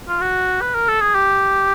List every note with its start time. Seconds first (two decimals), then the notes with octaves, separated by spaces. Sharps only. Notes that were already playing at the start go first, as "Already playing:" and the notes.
0.08 F4
0.21 F#4
0.61 B4
0.75 A#4
0.88 A4
1.00 G#4
1.15 G4